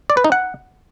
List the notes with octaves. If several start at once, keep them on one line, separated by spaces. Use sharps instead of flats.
D5
B4
D#4
F#5